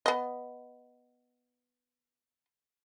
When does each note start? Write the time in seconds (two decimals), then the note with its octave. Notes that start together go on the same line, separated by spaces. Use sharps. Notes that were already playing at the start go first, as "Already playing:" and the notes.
0.06 B3 D#5